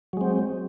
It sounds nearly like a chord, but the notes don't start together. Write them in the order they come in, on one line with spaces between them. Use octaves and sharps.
F#3 G#3 C4